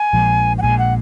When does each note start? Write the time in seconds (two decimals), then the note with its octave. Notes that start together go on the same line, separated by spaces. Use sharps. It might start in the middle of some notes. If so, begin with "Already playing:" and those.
Already playing: G#5
0.13 A#1 A#2 F3 G#3
0.58 F#5
0.62 A#1 A#2 F3 G#3 G#5
0.79 F#5